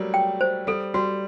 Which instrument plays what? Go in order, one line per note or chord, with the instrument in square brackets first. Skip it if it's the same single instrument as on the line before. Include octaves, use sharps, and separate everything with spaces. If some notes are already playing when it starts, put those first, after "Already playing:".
Already playing: [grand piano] F#3 G3 A3 A#3
[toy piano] G5
C5
[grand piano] G3 [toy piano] A4
[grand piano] G3 [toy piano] F#4